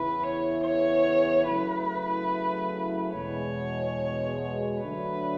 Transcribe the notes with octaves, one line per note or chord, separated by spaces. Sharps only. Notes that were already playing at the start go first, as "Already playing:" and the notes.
Already playing: E2 C#3 E3 B3 E4 B4
C#5
C#5
C#3 F#3 A3 E4 B4
E2 B2 G#3 C#5
D3 F#3 A3 D4 B4